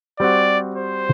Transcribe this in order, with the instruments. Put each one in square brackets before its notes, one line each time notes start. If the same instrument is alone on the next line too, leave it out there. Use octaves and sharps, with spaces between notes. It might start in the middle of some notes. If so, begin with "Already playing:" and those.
[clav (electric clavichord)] G3 C4 F#4 [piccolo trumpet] D5
[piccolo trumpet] C5